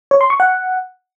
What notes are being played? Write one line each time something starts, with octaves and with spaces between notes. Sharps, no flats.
C#5
C6
C#6
F#5